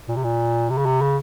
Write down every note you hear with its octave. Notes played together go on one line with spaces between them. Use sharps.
A#2
C3
A#2
C3
C#3
C3
C#3